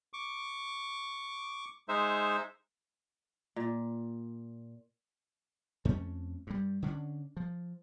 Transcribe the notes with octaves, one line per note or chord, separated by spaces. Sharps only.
C#6 D6
G#3 D#4 C5 E5
A#2
F2 A3 C#4
G2 G3
D3 C#4 D4
F3